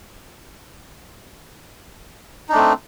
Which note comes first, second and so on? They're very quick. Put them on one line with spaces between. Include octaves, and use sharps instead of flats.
D#4 D4 A3 C4